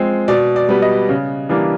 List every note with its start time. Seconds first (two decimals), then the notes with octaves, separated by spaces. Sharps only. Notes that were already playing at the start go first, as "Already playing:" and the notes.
Already playing: F3 G#3 C4
0.28 B2 D5
0.56 D5
0.69 G3 B3
0.82 D#5
1.09 C#3
1.49 E3 G3 A#3 D4